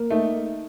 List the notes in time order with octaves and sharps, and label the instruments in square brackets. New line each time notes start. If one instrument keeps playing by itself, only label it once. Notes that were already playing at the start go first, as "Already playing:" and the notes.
Already playing: [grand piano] A#3
[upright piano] A3 [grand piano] D#4